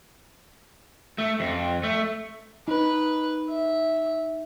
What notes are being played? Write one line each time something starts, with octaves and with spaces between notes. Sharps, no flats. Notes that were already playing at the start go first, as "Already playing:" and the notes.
A3
F2
A3
D#4 B4
E5